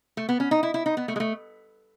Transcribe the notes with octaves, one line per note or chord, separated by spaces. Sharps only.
A3
B3
C#4
D#4
E4
E4
D#4
B3
A3
G#3
A3